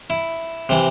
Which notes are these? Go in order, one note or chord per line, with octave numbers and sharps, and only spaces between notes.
E4
C3 E3